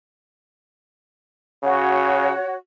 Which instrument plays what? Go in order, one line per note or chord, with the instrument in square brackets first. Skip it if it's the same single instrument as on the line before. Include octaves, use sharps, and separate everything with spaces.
[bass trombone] C#3 [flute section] F#4 C#5